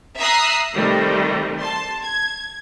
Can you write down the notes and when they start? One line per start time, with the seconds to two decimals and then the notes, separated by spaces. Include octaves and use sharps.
0.19 E5 A#5 D#6 E6 F#6 C7
0.74 C3 D#3 G3 A3
1.60 A5 C6
2.02 G#6